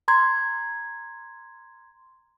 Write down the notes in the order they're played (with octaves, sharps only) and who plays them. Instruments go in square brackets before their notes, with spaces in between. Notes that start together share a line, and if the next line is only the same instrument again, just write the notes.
[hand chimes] A#5 C6 G#6